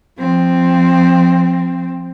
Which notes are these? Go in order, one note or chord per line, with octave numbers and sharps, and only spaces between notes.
F3 C4